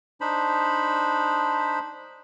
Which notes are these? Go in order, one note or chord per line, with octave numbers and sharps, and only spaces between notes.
D4 D#4 C5 B5